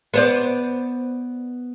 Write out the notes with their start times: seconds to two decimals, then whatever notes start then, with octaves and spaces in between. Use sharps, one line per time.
0.14 B3 C5 D5